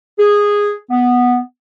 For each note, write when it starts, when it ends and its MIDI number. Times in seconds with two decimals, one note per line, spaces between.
0.19 0.74 68
0.90 1.38 59